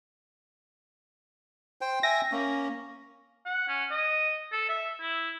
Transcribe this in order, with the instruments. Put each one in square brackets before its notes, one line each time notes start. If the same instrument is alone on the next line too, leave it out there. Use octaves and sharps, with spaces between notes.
[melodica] C5 G5
[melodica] E5 G5 G#5 [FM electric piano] A#6
[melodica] A#3 C#4
[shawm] F#5
C#4
D#5
A4
E5
E4